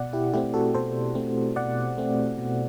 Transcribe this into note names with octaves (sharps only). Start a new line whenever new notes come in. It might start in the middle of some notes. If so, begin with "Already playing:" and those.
Already playing: B2 D5 F#5
E4 G4
A3 C4 E4 G4
F#4 A4
B2 A4 C5
A3 C4
B2 D5 F#5
A3 C4
B2